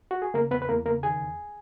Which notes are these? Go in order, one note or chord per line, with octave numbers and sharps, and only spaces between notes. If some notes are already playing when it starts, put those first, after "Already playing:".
F#4
G#4
C#3 A#3 A#4
E2 B3 B4
B4
E2 A#3 A#4
C#3 A#3 A#4
D#3 G#4 G#5
E2